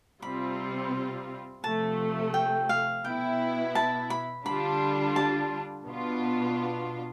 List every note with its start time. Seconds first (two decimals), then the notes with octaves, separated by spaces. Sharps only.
0.22 C3 G3 C4 F4 B5
1.64 C3 F3 A3 A5
2.34 G5
2.69 F5
3.04 B2 B3 E4 G5
3.75 A5
4.10 B5
4.45 D3 G3 D4 F4 B5
5.16 A5
5.86 B2 B3 D4 F4